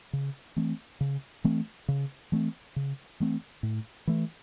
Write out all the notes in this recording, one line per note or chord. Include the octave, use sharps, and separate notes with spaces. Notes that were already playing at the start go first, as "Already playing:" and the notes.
C#3
E3 A3 C4
C#3
E3 A3 C4
C#3
E3 A3 C4
C#3
E3 A3 C4
A2
E3 A3